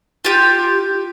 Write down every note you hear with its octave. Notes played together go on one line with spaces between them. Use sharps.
F4 G4